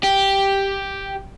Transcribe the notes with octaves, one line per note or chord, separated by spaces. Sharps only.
G4